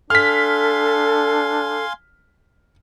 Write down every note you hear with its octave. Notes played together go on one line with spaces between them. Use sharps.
D4 A4 F5 G#5 C6 F6 B6